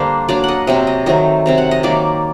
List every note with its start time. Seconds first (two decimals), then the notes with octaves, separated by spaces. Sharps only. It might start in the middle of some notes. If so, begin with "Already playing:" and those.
Already playing: D3 G3 A#3 D4 C5
0.29 F#3 A#3 D4 D5
0.44 D#5 F#5
0.67 C3 F#3 C4 D#5
0.87 D#5
1.06 D#3 F#3 A3 C4 D#5
1.46 C3 F#3 C4
1.58 F#5
1.71 D#5
1.83 D#3 F#3 A#3 D5